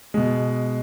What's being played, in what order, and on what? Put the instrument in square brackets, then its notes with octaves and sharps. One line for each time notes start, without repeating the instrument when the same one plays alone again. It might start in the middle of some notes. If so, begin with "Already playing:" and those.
[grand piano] B2 G#3